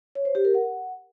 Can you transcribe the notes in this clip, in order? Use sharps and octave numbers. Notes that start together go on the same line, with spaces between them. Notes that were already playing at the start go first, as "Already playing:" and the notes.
C#5
C5
G4
A#4
F#5